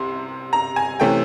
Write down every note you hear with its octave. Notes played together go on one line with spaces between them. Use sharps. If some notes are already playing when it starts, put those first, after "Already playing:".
Already playing: C2 C3 C6
A#5
G#5
C3 E3 A3 C#4 G5